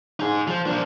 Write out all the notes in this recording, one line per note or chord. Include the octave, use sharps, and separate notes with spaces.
D#4 G#4
F3
F3 D4